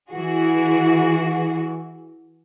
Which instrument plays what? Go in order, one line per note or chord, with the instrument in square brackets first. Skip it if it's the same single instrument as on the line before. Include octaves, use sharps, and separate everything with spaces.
[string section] E3 F#4 G#4